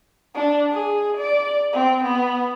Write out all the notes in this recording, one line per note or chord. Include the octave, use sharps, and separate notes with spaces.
D4
G#4
D5
C4
B3